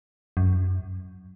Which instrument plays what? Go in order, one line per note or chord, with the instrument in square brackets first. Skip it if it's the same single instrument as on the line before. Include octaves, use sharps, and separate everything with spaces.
[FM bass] F#2